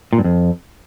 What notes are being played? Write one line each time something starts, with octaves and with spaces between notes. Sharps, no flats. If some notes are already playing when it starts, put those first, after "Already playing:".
A#2
G2
F2